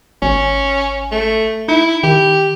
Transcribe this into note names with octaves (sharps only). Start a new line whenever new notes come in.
G#1 C#4
A3
D#4 E4
D#3 G4